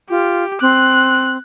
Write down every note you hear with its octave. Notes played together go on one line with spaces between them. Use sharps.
F4 G4
C4 F#6